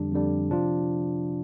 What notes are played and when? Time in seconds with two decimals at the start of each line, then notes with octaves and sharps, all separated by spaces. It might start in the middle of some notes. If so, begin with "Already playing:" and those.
Already playing: F2 D3 G3 D4
0.12 F2 D3 G3 D4
0.50 C3 F3 D4 F4